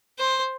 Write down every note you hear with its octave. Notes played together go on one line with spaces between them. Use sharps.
C5